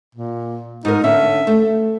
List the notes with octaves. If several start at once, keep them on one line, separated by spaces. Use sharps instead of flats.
A#2
G#2 D#4 A#4
D3 C#4 E5
A3